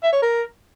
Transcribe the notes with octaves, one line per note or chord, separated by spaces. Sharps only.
E5
C#5
A#4